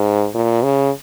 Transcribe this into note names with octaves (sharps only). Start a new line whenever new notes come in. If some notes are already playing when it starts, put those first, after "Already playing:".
Already playing: G#2
A#2
C#3